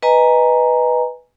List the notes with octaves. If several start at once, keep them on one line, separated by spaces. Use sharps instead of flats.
B4 D#5 G#5 A#5